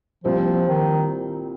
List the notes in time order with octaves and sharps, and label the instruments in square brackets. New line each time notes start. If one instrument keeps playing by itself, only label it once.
[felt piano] C2 A#2 G3 C4 G4 [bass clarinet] F3
[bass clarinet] D#3